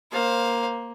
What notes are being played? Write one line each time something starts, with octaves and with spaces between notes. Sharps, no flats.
A#3 C5 F5